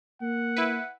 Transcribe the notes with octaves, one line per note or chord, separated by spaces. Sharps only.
A#3 F#5
E4 B4